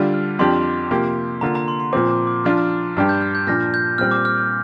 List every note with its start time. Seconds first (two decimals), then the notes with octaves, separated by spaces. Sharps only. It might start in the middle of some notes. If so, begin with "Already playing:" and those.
Already playing: D3 G3 D4 F4
0.14 F6
0.39 F2 F3 D4 G4 C6
0.91 C3 F3 A#3 G4
1.41 D3 A#3 F4 A#5
1.55 A#5
1.68 C6
1.80 C6
1.93 A#2 F3 C4 D6
2.11 D6
2.27 D6
2.44 F3 D4 F4 F6
2.58 F6
2.70 F6
2.83 D6
2.97 G2 G3 D4 G4 F6
3.09 G6
3.21 F6
3.35 G6
3.47 A#2 F3 D4 F6 A#6
3.74 G6
3.98 A#2 G3 C4 F6
4.11 D6
4.25 F6
4.38 G6